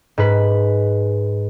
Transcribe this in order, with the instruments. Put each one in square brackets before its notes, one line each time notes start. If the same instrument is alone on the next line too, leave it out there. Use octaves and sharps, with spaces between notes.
[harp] G#2 B4